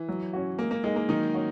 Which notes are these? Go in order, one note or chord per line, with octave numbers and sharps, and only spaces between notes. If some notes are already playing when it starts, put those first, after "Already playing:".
Already playing: E3
F#3
C#4 F#4
G#3 A#3
A#3
G#3 D#4 G#4
A#3
D#3 F#3 D#4
C#4 F#4